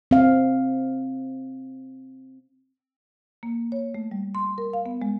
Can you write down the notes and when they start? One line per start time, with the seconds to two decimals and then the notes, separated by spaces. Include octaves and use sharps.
0.11 C4 F5
3.43 A#3
3.72 C#5
3.95 A3
4.11 G3
4.35 C6
4.58 A#4
4.73 F5
4.86 B3
5.02 G#3